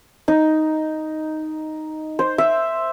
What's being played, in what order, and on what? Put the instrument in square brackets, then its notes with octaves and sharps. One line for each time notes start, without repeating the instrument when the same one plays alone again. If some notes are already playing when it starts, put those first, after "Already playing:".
[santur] D#4
C5
E5